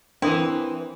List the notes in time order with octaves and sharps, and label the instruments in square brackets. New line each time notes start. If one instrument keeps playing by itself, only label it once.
[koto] E3 E4 [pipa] C4 [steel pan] D4 A#4 D#6